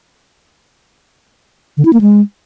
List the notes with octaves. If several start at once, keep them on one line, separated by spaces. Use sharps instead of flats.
D3
E4
A#3
G#3